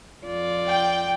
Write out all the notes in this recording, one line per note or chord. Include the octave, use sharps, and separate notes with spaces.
F2 F4 D5
G5